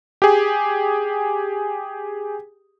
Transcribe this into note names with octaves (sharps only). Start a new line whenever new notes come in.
G4 G#4